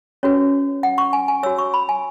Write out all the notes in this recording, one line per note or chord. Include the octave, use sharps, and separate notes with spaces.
C#4 F#4 B4 C#5
F#5
C#6
G#5
G#5
F#4 C#5 E6
C#6
B5
G#5